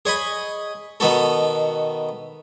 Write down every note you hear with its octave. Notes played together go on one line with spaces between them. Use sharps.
G#4 C#5 D#5 B5
B2 D#3 B3 F#4 A4